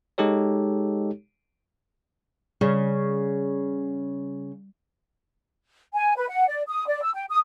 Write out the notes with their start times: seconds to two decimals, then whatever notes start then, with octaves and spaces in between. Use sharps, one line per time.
0.18 G#3 D#4 G4 A4 C#5
2.61 C#3 G3
5.94 G#5
6.16 B4
6.29 F#5
6.48 D5
6.68 D#6
6.87 D5
7.03 E6
7.14 G5
7.29 D#6